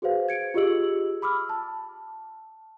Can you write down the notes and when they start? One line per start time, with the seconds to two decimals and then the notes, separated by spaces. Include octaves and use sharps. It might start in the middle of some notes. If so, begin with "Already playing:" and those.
0.02 F#4 G#4 B4 C5 F5
0.29 G#6 C#7 D7
0.54 F4 G4 G#4 D#5 E6 F#7
1.22 B5 D6 E6 F6
1.49 A5